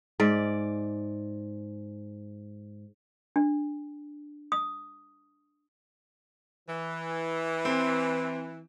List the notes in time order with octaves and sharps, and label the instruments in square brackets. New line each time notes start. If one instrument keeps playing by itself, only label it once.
[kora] G#2 D5
[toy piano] D4
D#6
[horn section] E3
[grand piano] C4